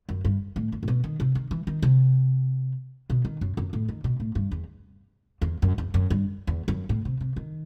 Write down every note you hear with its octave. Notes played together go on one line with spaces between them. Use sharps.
F#2
G2
A2
F#2
A2
B2
D#3
C3
D#3
E3
D#3
C3
B2
D#3
F#2
F#2
A2
D#3
B2
A2
G2
E2
E2
F#2
E2
F#2
G2
E2
F#2
A2
C3
C3
D#3